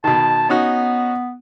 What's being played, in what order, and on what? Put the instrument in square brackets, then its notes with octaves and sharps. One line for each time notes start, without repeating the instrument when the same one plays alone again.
[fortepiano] B2 D#3 [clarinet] A5
[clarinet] B3 [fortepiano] C#4 D#4 F#4